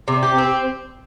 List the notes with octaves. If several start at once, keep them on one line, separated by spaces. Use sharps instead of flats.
C3
G4
C4